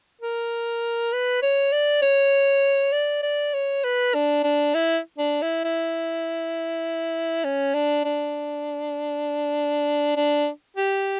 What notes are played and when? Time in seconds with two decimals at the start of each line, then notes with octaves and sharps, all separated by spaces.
0.22 A#4
1.13 B4
1.43 C#5
1.72 D5
2.02 C#5
2.93 D5
3.23 D5
3.54 C#5
3.84 B4
4.14 D4
4.44 D4
4.74 E4
5.18 D4
5.42 E4
5.64 E4
7.44 C#4
7.74 D4
8.05 D4
10.16 D4
10.77 G4